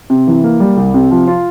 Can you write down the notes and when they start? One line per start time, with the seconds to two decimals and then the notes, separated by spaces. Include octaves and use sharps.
0.10 C3
0.27 E3
0.44 A#3
0.60 G3
0.77 C2
0.94 C3
1.11 F3
1.28 F4